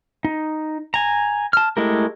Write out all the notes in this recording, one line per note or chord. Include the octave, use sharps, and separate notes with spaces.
D#4
G#5 A#5
A5 F6
G#3 A3 E4 G4 A#4